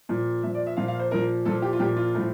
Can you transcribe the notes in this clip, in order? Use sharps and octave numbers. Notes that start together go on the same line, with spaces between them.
A#2 F3
A#2 F3 E5
D5
E5
A#2 F3 F5
F5
C5
A#2 F3 A#4
A#2 F3 A4
G4
F4
A#2 F3 G4
F4
A2 F3